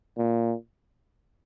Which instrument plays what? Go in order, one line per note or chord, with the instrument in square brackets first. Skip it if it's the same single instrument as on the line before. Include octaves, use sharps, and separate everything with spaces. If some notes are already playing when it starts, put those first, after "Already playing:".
[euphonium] A#2